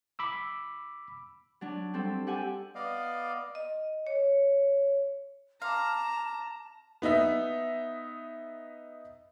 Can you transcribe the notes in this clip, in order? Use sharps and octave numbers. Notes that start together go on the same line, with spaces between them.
B5 D6 E6
F#3 D4
G3 C4 D4 A4
G4 A4 F#5 G#5
B3 D5 D#5 F5
D#5
C#5
F5 A5 A#5 C6 D6
B3 D#4 D#5 E5